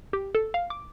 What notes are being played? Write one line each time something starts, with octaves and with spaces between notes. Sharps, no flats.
G4
A4
F5
D6